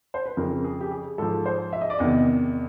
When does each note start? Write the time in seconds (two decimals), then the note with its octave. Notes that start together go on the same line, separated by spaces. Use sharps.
0.14 C5
0.26 B4
0.37 F2 C#3 F3 A#4
0.64 G#4
0.81 G4
0.91 G#4
1.18 G#2 F3 A4
1.46 C5
1.73 E5
1.81 D#5
1.90 D5
1.99 E2 C3 D#3 D#5